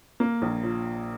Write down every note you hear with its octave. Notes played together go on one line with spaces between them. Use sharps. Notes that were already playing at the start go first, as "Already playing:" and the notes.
A#3
A#1
F3